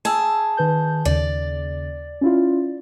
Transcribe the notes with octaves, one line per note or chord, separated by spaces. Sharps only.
G#4 A5 E6 G#6
D#3 B4 G6
D#2 C#3 D5
C#4 E4 F4